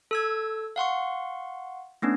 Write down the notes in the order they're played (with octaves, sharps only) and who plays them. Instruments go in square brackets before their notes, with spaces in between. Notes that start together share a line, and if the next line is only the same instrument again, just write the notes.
[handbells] A4 E6 G#6
F5 F#5 C6 C#6
A3 B3 C#4 D4